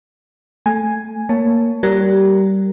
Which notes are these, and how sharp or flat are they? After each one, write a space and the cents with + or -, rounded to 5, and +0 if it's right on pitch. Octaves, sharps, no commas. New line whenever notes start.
A3 +0 G#5 +0
A#3 -5 C#5 +10 A5 +0
G3 -20 A#4 +0